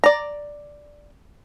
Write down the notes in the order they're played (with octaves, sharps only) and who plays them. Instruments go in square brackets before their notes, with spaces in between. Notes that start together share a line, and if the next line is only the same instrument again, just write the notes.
[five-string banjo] D5 A#5